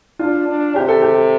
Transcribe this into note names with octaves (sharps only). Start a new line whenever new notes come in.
D4 F4
D4
C3 G4
A4
G4